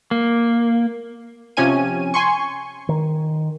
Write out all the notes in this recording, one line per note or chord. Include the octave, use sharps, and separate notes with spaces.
A#3
C3 F3 C#4 G#5 D#7
G#5 C6 C#6
D#3